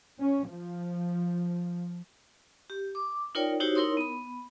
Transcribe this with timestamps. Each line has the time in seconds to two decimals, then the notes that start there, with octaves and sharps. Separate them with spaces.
0.20 C#4
0.51 F3
2.70 G4
2.95 D6
3.35 D#4 F4 A#4 C#5 D5 G5
3.60 D#4 E4 F#4 G4 C5 C#5
3.75 D#4 E4 A#4 C#5 C6 D#6
3.97 B3 B5